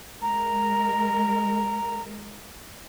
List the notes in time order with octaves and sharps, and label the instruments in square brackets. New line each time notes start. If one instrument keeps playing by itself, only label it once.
[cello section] G#3 A#4 [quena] A#5